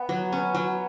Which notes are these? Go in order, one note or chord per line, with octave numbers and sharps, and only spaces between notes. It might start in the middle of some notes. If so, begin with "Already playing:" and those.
Already playing: B3
F#3
C#4
F#3 B3